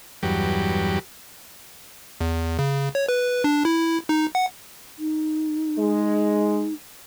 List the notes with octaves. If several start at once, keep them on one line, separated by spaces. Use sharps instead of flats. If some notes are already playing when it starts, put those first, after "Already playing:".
E2 G2 F#3 G4
E2
C#3
C#5
B4
D4
E4
D#4
F#5
D#4
G#3